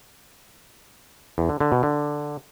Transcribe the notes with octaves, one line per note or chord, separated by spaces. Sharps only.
E2
D3
D3
B2
D3